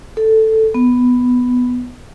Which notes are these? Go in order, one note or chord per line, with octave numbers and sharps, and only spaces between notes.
A4
B3